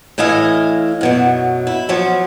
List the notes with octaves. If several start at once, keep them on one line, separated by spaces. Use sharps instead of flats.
A2 E3 E4 D#5 F5 G#5
F#2 B2 F#3
E4
F3 F#3 C#4